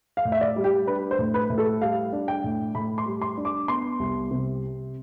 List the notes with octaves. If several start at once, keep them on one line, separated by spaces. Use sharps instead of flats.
F5
A2
E5
D5
G3
G4
D4 B4
C5
A2
B4
A2
A4
G3 F5
D4
G5
A2
A2 B5
C6
G3
C6
D4
D6
B3 C6
C2
C3